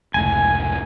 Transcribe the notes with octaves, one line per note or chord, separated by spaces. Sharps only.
F1 C#2 A2 G#5